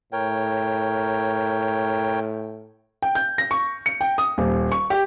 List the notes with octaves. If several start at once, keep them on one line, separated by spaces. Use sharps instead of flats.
A2 A#4 C#5 G5
G5
G6
A#6
C#6
C#7
G5
D#6
D#1
C#6
G4